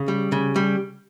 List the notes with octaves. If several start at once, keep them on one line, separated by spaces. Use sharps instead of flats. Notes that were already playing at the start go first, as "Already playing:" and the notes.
Already playing: C#3
G3
C#3
G3